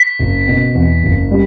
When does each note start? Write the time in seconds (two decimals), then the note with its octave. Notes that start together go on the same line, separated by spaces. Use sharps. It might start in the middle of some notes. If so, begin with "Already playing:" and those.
Already playing: B6
0.19 F#1
0.48 B2
0.75 E2
1.03 F#1
1.31 G3